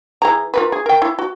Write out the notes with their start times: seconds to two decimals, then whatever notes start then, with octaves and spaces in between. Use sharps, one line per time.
0.22 E3 G#4 A#5
0.54 F4 A#4 B4
0.72 G#4
0.86 A#4 G5
1.02 E4
1.19 F#4